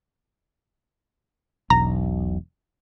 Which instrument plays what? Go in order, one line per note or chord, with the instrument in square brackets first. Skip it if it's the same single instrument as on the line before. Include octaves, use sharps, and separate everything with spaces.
[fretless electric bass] E1 B1 [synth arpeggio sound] A#5